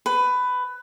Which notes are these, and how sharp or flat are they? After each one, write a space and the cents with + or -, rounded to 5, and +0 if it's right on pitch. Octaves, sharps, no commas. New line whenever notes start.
B4 +15